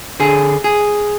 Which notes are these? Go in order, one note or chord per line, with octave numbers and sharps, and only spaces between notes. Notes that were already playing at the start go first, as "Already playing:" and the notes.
D3 G#4
G#4